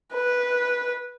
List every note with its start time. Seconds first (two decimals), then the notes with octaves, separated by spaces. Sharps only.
0.15 B4